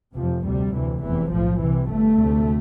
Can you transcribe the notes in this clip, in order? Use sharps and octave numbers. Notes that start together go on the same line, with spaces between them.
F1 F2 C3 F3
D2 C3 G3
D2 C3 E3
F1 E2 C3 E3
B1 A2 F3
C2 C3 E3
G1 G2 A3
D2 C3